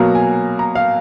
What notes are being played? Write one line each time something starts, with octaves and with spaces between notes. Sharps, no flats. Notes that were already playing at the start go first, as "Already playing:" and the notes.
Already playing: B2 F#3 A#3 A#5
G#5
A#5
F5